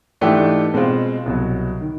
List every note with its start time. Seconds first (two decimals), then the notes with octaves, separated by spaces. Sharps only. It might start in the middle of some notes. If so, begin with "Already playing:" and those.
0.21 G#2 E3 A3 D4 G4
0.74 B2 G#3 C4 F4
1.26 C2 B2 F#3
1.81 D#3